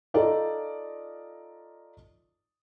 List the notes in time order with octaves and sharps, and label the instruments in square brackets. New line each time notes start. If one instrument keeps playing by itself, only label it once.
[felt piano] D#4 F4 A4 D5 D#5